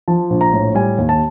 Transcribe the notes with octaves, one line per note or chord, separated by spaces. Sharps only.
F3 A5
A#1
A#5
A2
G3 G#5
D#2
A5